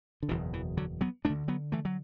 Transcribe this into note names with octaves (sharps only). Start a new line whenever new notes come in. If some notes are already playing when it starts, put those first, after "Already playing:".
D3
F#1 E2 B2 E3
E3
D3 F#3
F#3 B3
D2 D3 A3 D4
F#3 B3
E3 A3
F#3